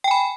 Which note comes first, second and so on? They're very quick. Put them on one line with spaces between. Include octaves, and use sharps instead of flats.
G5 G#5 B5